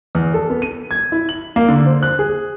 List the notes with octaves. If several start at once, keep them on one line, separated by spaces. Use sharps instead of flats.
E2
A4
B3
D#7
G#6
E4
F#7
A#3
D3
C5
F#6
G#4